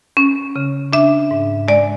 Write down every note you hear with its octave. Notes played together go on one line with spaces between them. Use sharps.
C#4
C#3
D4 E5
G#2
G#3 D5